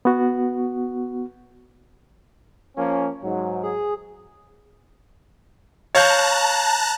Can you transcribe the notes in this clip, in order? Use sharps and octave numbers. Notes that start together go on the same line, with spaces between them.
B3 F#4
F3 A#3 C#4
G#2 F#3
G#4
C#5 F5 A5 A#5 F#6 G6